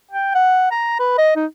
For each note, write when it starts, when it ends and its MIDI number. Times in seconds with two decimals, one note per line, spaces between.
0.12 0.33 79
0.35 0.67 78
0.72 0.98 82
1.00 1.13 71
1.18 1.33 75
1.36 1.46 63